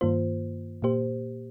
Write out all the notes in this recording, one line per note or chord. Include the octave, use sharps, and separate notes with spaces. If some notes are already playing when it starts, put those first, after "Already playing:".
G2 D#3 A#3 F4 C5
A#2 A#3 G4 C5